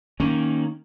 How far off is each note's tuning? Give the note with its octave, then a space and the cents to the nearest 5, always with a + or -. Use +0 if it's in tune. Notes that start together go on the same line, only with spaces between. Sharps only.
D#3 +0 A#3 +0 C#4 +0